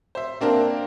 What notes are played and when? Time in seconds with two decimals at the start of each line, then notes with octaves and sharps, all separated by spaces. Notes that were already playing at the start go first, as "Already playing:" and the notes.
0.15 C5 E5
0.41 A#3 C4 D4 A#4